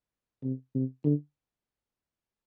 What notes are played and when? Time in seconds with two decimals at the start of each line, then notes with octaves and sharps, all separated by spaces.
0.43 C3
0.75 C3
1.04 D3